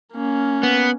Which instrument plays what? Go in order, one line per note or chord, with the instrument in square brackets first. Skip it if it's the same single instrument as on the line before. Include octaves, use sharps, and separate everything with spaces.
[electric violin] A#3 C#4
[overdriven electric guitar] B3